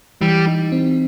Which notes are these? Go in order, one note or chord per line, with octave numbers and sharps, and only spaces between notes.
E3 G3
D#4
C4